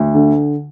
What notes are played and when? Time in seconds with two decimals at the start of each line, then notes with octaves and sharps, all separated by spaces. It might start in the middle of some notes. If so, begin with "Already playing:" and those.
Already playing: D2
0.14 D3